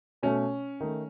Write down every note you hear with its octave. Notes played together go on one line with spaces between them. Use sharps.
B2 A3 C#4
D#3 A3